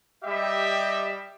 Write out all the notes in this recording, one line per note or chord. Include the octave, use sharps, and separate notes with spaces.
G3 G4 D#5 E5